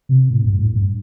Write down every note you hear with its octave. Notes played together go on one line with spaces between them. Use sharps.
C3
A2
G2
A2
G2